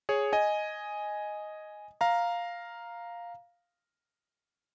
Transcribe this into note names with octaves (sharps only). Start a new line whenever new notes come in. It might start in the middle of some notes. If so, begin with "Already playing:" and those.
G#4 C#5
D#5 G#5
F5 A#5